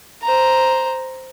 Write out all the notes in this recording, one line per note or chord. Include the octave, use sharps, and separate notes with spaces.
C5 A#5